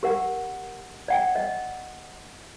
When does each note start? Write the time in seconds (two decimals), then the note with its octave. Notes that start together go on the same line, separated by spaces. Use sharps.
0.03 G4 A#4 F#5
1.08 D5 F#5 G5
1.36 D#5